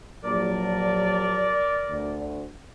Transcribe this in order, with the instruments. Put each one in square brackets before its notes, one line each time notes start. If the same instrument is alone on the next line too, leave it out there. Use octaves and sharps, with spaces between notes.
[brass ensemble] A#1 F#3 A5 [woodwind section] A#4 D5
[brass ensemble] D2